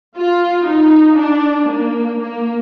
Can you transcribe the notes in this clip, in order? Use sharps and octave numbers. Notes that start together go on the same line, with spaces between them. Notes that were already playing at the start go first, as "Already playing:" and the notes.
F4
D#4
D4
A#3
A#3